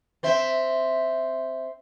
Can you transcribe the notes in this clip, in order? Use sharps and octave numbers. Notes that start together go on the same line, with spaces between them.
C4 C5 E5